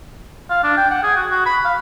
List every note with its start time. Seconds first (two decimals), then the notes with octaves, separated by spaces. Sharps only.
0.50 F5
0.63 D4
0.77 G5
0.91 F#5
1.03 G#4
1.16 F#4
1.31 F#4
1.46 B5
1.65 F5